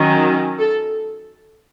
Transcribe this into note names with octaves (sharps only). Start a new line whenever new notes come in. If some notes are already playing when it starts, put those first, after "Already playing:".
Already playing: D#3 F#3 C#4
A4